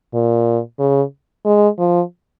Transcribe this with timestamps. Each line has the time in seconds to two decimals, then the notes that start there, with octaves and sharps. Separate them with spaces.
0.14 A#2
0.80 C#3
1.45 G#3
1.79 F3